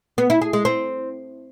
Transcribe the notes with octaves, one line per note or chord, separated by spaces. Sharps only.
B3
E4
G#4
G#3
C4